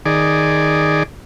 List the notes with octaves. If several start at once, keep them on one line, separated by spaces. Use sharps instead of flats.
D#3 G#4 D5